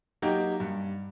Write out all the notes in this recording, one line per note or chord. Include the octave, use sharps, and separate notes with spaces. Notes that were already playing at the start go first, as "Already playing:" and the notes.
F#3 A#3 D#4 G4
G2